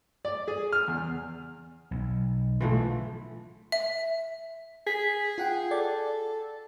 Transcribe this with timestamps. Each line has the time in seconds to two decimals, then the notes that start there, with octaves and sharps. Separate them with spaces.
0.25 D5
0.48 G#4
0.72 F6
0.88 E2
1.91 B1
2.61 B2 D3 E3 F3 A3
3.72 E5
4.87 G#4 B6
5.38 F4 F#5 G5
5.71 A4 D5